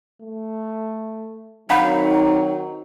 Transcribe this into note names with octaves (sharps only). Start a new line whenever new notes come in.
A3
D#3 F#3 C4 D#4 F5 F#5 B5